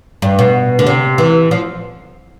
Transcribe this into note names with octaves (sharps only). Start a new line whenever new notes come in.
G2
B2
D3
C3
E3
F3